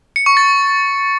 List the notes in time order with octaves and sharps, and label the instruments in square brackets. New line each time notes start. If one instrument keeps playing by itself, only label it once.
[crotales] C#7
C#6
A6